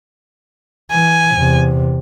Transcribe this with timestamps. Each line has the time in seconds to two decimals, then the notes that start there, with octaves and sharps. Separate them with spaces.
0.91 E3 G#5
1.35 E2 C3